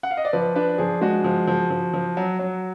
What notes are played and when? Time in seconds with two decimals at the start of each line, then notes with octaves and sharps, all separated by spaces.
0.03 F#5
0.11 F5
0.17 D#5
0.25 D5
0.33 F3 B4
0.55 D4 B4
0.78 F3 G#4
1.01 G#3 F#4
1.24 F3
1.47 F3
1.70 F3
1.93 F3
2.17 F#3
2.39 F#3